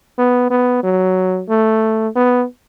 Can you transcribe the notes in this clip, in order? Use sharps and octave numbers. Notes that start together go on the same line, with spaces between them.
B3
B3
F#3
A3
B3